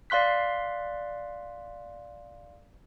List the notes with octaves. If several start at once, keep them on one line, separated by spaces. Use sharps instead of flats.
D5 F5 C6 F#6 B6